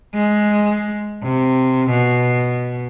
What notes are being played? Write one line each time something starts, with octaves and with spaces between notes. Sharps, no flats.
G#3
C3
B2